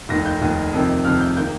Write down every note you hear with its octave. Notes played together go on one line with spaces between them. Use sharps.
F1 D#2 D#3 A#6
G6
F1 D#2 D#3
F2 C3 D#3
F2 C3 D#3 F6
G6
D#3 A#3 G6